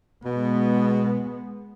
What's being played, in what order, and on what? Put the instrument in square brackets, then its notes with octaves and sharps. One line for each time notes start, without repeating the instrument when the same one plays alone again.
[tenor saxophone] B2 [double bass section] G#3 B3